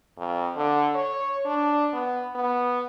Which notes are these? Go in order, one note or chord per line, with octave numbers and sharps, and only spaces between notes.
F2
D3
C#5
D4
B3
B3